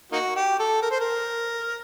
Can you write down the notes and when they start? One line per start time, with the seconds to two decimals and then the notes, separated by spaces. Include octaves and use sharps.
0.12 A#3 D#4 F#4
0.36 G4
0.59 A4
0.82 A#4
0.91 C5
1.00 A#4